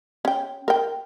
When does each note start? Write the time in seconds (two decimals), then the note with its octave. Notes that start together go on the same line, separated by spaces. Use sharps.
0.25 C#4 G5
0.68 A#4 G5